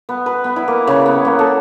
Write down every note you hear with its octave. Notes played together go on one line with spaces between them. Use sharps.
B3
B4
B3
E4
A#3
C#3
B3
A#3
A4